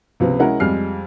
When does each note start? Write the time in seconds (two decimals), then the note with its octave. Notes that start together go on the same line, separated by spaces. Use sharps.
0.20 C#2 C3 F3 B3
0.39 G#3 C#4 E4 A#4 F#5
0.60 F2 G3 G#3 F6 C7